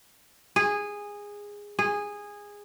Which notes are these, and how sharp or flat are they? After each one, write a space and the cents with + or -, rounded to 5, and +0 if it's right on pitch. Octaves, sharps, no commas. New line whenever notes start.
G#4 -15
G#4 -15